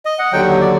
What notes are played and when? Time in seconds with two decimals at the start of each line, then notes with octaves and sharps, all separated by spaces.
0.06 D#5
0.19 F#5
0.33 D#2 D3 F#3 G5
0.61 D5